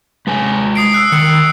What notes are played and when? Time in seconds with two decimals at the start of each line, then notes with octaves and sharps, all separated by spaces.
0.27 G#3 B4 G#5
0.75 D#6 C7 D7
0.92 E6 F#6 C7
1.12 D#3 C#7